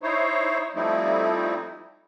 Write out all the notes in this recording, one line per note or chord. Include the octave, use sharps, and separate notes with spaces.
D#4 E4 C5 C#5
F3 G3 A3 C4 D#4 E4